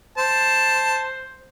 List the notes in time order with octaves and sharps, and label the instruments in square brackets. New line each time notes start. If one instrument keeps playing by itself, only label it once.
[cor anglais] C5 [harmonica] A5